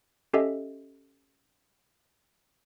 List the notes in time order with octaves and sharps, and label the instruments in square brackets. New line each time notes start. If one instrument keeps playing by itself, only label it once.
[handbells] C#4 G4 A4 D#5 E5